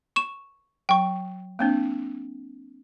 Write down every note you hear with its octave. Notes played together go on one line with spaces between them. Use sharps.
C#6 E7
F#3 G5 C#6
A#3 C4 D4